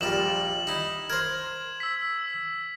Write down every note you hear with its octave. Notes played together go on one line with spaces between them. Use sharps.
A#1 A#2 G3 E7 F#7
D#4 E4
A#4 C5 G#6
E6 B6